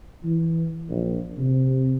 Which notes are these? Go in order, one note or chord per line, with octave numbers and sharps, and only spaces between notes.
E3
A#1
C3